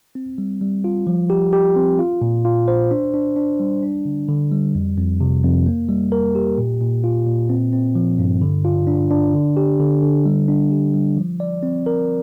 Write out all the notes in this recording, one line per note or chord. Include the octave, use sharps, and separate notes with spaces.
C4
G3
G3
F4
F3
G4
G4
C4
F4
A#2
F4
C5
D4
D4
D4
G3
D4
D3
D3
G3
F2
F2
C3
F2
A#3
G3
A#4
G4
A#2
A#2
F4
A#2
C4
C4
F3
G2
D3
F4
D4
D4
D3
G4
D3
D3
G3
D4
G4
G3
F3
D5
C4
A#4